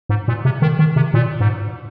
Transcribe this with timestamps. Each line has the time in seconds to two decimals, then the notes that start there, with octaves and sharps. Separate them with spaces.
0.09 G#2
0.28 A#2
0.45 C3
0.62 D#3
0.79 D#3
0.96 C3
1.14 A#2
1.40 G#2